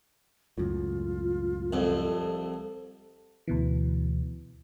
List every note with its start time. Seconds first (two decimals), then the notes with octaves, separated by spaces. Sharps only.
0.58 C#2 F#2 A2 F4
1.73 C2 F2 A4
3.48 D2 B2 E3